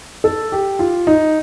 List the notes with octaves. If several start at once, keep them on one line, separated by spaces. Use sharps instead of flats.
A4
G4
F4
D#4